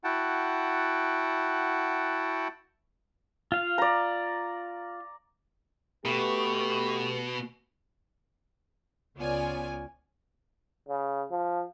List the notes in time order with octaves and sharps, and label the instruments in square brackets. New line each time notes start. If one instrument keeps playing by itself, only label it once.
[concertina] E4 F#4 F#5 G5 A5
[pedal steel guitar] F4 F5
[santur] D5 A#5
[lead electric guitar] B2 [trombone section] A3 B3 G4
[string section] C#2 B3 F4 C#5 D5 G#5
[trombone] C#3
F3